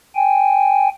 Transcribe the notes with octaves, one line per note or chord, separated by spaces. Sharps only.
G5 G#5